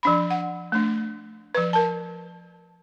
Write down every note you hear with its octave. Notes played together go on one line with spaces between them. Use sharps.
F3 D4 B5
F#5
A3 D4
F3 B4
A#4 A5